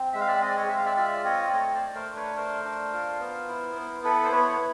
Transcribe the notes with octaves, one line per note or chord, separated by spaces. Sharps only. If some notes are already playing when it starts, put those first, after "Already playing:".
Already playing: C4
G#3 E5
F5
D5 E5
C4 D#5
D5
C#5 D#5
G#3 E5
F5
D5 E5
F4 D5 E5
C4 C#5 D#5
D5
A3 C#5 D#5
C#5
C5 D5
A3
A#4 C5
D4
B4 C#5
A3 A#4 C5
D4
F4
B3
E4
B3
E4 A4 B4
C5
B3 B4 C#5